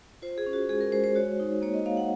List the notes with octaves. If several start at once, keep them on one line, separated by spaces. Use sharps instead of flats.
F4 C5
G#4
C#4
F#4
G#3 G#4
A#4
G#3 C5
C5
F#4 C#5
D#4
A#3 C#5
D#5
A#3 F5
F#5